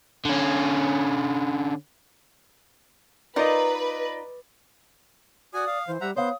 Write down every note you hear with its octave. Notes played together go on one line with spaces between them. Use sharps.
D3 C#4
D#4 F4 A#4 B4 D5 D#5
F#4 D5 G#5 D#6
F5
E3 C5
G3 E5 F#5 A#5
B3 C5 C#5 F5 C6 D#6